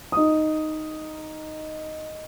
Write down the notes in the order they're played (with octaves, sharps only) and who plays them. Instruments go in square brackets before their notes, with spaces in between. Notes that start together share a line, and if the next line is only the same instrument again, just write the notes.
[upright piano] D#4 D#6